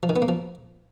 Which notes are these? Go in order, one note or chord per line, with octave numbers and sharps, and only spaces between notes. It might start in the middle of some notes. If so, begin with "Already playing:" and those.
F3
D#3
B3
A#3
F3